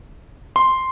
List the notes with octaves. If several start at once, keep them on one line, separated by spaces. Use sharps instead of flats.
C6